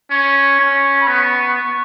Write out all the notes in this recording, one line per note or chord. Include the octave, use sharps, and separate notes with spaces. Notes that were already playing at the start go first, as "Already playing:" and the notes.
C#4 C#6
C#4
B5
B3 C#6